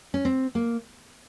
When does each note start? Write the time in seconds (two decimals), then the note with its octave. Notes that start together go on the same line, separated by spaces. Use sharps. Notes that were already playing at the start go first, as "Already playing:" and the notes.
0.14 C#4
0.25 C4
0.55 A#3